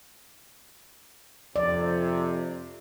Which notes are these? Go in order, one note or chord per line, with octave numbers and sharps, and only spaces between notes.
F2 C3 D5